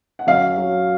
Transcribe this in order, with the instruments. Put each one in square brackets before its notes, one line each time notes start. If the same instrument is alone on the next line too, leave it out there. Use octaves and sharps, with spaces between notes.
[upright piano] F#5
F#2 F5
F#3